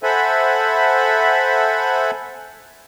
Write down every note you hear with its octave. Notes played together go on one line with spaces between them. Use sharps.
A4 C5 E5 F#5 G#5 B5